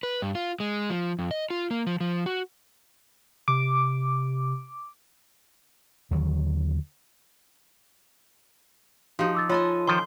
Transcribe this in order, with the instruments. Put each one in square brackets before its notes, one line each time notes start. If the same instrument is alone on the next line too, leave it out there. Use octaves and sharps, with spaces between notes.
[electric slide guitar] B4
G2
F4
G#3
F3
F2
D#5
F4
A#3
F3
F3
F#4
[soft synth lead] C3 [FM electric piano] D6
[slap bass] D#2 D3 D#3 F#3
[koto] F3 D#4 [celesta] F#4 G4 F5
[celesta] D6 E6 A6
[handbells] F4 [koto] A4 D#5 G#5 [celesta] C#5 B5 A6
[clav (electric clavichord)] D#3 F3 [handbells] C6